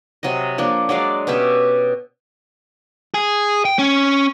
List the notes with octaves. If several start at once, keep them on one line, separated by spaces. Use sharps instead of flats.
C3 F#3 C4 D#5
F3 A#3 D4
F#3 G#3 D5 F5
B2 C#4 G4 E5
G#4
G5
C#4